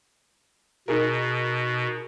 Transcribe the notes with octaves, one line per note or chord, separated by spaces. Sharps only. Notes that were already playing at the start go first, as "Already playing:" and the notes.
B2 D#4 G#4 A#4